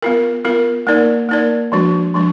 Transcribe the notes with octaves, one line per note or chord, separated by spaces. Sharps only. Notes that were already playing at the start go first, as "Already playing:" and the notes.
B3 F4 A#4
B3 F4 A#4
A#3 D#4 A#4 D5
A#3 D#4 A#4 D5
F3 G#3 D4 F#4
F3 G#3 D4